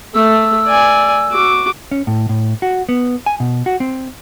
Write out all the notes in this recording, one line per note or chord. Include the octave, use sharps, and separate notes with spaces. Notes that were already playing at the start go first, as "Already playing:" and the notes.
A3 E6
D5 G#5
F#4 D6
C#4
A2
A2
F#4
B3
G#5
B2
F#4
C4